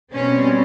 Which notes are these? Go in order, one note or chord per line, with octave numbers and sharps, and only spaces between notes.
B2 G3 C4 C#4